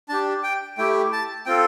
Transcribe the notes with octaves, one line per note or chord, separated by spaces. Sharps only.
D4 G4 A5
G5
A3 E4 G4 G5
A5
C4 F4 A4 G5